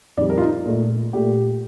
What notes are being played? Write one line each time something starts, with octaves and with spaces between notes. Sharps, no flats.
F2 D#3 G3 D5
A#4
F4
D#4
A#2 A3
A#2 A3 G4